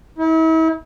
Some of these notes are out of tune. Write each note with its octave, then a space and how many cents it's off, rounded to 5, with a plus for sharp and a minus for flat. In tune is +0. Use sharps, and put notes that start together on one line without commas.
E4 -40